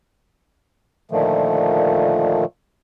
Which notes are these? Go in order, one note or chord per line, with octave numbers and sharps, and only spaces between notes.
A#2 D3 D#3 F3 A3